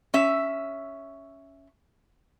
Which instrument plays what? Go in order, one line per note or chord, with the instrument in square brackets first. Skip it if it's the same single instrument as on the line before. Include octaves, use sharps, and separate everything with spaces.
[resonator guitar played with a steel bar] C#4 E5